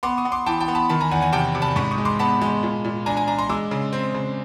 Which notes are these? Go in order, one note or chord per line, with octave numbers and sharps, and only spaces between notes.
B3 C6 D6
C#6 D#6
B3
C6 D6
E3 G5 A5
G5 A5
B3
A5 B5
D#3 A5 B5
G#5 A#5
E2 F#5 G#5
F#5 G#5
C3 G5 A5
C3
A5 B5
G#2 B5 C#6
C#6 D#6
G#3
C6 D6
B3 A5 B5
G#3
A#2
A#2
D4 G#5 A#5
G#5 A#5
D4 G#5 A#5
A#5 C6
G#3 D6 E6
C#3
C4
C#3